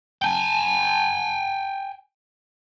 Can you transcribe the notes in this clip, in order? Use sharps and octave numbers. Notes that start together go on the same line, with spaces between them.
G5 G#5